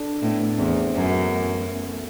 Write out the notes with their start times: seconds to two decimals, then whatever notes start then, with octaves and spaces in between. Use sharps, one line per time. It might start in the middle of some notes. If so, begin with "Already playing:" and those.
Already playing: D4 A4
0.22 A2 B3
0.58 E2 C4
0.95 F#2 B3
1.31 A3
1.67 B3
1.85 A3